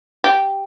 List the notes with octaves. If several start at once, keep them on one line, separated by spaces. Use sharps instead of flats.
G4